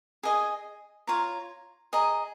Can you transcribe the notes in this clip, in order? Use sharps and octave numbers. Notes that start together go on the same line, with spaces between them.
G#4 D#5 G#5
F4 C#5 A#5
G#4 D#5 A#5